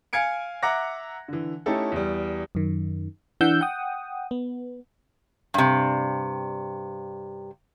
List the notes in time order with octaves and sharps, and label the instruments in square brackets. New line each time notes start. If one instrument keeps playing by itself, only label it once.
[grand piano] F5 G#5 G#6 C#7 D7
E5 F#5 A#5 D6 F#6 A#6
D3 E3
A3 C#4 D#4 E4 G4 A4
E2 G3
[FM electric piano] F#2 D#3
E3 D4 F#5 E6 G6
F#5 G5 D#6
B3
[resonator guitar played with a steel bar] G2 C3